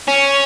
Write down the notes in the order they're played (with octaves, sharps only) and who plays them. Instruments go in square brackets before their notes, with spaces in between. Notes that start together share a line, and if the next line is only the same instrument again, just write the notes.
[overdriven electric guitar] C#4